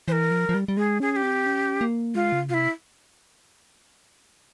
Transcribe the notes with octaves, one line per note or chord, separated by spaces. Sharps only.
E3 A#4 C5
F3
F3
G3
G3
G#3 G#4
C#4 G#4
G#4
G4
C4
C#4
A#3
G#3 F4
C#3
C3 E4 F4